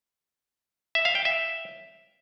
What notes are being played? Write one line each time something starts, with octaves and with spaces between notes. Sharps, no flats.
E5
F5
G5
E5